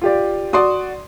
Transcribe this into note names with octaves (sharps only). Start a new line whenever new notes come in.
F4 G4 D5
F#4 D5 C6 D#6